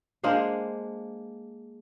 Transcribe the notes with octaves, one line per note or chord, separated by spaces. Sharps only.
G#3 A#3 D4 C5